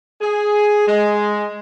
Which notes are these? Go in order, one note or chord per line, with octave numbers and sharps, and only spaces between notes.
G#4
G#3